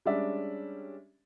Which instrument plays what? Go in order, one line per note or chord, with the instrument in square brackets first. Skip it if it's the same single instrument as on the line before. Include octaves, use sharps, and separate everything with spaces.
[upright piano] G3 G#3 C#4 D4 D5 E5